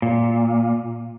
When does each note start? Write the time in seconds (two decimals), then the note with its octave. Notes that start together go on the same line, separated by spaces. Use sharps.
0.02 A#2